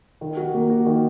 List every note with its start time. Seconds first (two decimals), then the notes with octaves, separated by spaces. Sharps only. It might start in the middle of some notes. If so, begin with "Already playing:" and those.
0.21 D#3
0.37 F#4
0.54 A#3
0.70 F#4
0.86 D#3